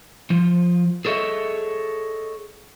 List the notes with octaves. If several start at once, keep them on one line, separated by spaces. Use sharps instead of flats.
F3 F4
G#4 A4 C#5 D#5 E5